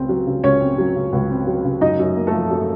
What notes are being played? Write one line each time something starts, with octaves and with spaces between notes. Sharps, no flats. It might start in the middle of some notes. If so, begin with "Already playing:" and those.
Already playing: C#2 C#3 C4
F#3
C#3
C#2 C#4 C#5
C4
F#3
C#3
C#2
C4
F#3
C#3
F#2 D#4 D#5
F#2
A#3
A3 A4
F3
F#2